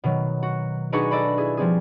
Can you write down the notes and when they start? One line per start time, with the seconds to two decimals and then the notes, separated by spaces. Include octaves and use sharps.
0.04 B2 D#3 F#3
0.43 F#4
0.92 D4 D#4 F#4 G#4 B4 C#6
1.11 A4 D5 D#5 B5
1.38 E4 G#4
1.57 F3 G3 C4 G#4